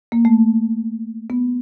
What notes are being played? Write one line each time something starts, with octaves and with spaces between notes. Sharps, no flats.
A#3
A3
B3